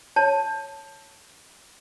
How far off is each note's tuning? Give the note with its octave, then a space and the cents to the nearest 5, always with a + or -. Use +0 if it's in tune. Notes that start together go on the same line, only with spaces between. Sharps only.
C#5 +0 A5 +0